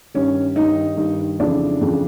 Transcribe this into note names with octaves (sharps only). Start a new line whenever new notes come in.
G2 D#3 C#4
G2 D#3 D#4
G2 D#3
F2 C#3 E3 D4
F2 C#3 E3